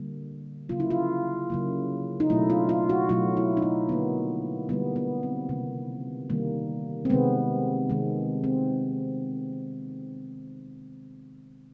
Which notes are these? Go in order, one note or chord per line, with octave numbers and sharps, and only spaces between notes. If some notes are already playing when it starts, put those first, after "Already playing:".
Already playing: D3 G3 A#3
C#3 F#3 A#3 F4
E4
F4
C#3 F#3 A#3
D#4
B2 F#3 A3 E4
F4
F4
F#4
B2 F#3 A3 F4
E4
D#4
E4
D3 G3 A#3 B3
D3 G3 A#3 B3
B3
C4
C3 D#3 G3 A#3
C3 D#3 G3 A#3
C4
C3 D#3 G#3 B3
C3 D#3 G#3
C4